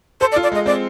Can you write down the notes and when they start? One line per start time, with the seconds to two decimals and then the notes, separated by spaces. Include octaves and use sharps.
0.21 A4 C5
0.32 D5
0.36 F4
0.43 D5
0.52 G#3 D#5
0.66 C4 D5